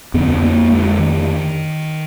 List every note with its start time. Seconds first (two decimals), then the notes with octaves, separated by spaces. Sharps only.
0.14 F2 D3 B3
0.43 A#3
0.71 G#3
0.99 D#3